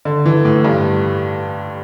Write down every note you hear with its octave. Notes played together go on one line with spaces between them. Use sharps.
D3
E3
A2
G2